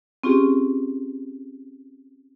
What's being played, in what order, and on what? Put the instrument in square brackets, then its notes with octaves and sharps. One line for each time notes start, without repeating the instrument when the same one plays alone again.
[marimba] C4 C#4 F4 G4 G#4